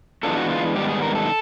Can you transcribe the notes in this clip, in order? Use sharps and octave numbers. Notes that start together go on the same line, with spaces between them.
E3 G#3 B3 D4 F4 A4
F#4
F4
G#2 D#3 G3 B3 G4
G#4
A#4
A4